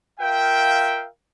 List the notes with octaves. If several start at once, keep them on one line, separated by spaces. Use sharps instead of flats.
F4 A#4 E5 F5 G5